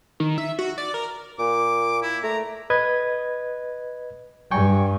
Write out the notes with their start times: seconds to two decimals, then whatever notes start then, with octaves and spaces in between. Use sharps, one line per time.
0.20 D#3
0.38 E5
0.59 F#4
0.78 D5
0.94 A#4
1.39 A#2 D6
2.02 E4
2.24 A3 A#5
2.70 B4 D#5 G#6
4.51 G2 G5 G#5 C#6